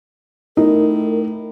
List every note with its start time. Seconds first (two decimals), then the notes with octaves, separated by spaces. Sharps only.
0.57 A2 D#4 A#4